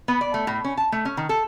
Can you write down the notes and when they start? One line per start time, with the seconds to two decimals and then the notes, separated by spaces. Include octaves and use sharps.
0.08 B3
0.21 D5
0.34 A3
0.47 A2
0.65 C#4
0.77 A5
0.92 A3
1.05 C#4
1.17 D#3
1.29 A4